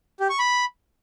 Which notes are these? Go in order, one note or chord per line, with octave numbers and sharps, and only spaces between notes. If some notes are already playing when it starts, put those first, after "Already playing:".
G4
C#6
B5